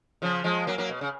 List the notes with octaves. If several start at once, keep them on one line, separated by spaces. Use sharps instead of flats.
C#3 F3
F3 G#3
F#3 A#3
F#3 A#3
B2
C#3